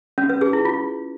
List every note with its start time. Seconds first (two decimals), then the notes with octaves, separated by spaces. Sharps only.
0.18 C#4
0.30 B4
0.41 G#4
0.53 E4
0.65 F4